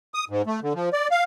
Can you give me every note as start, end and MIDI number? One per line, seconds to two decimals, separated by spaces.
0.14 0.25 87
0.29 0.42 44
0.46 0.60 57
0.63 0.73 50
0.75 0.89 53
0.93 1.08 74
1.11 1.24 77